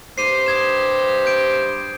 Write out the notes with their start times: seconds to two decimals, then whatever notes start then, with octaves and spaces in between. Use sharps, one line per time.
0.18 G2 G4 C5 C7 D#7
0.46 D#6 G#6 E7
1.26 G6 D7